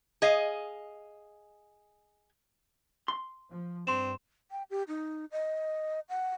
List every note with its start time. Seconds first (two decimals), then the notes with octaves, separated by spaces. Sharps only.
0.22 G#4 D#5 F5
3.08 C6
3.51 F3
3.87 G2 C4 C6 E7
4.51 G5
4.70 G4
4.88 D#4
5.32 D#5
6.09 F#5